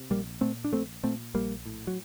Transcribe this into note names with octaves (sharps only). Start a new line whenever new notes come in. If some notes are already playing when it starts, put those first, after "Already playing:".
Already playing: C3
A#1 G3 A#3
A#2 A3 C4
D4
A#1 A3 C4
A#2 A3 C4
A#1 G3 A#3
A2
F#3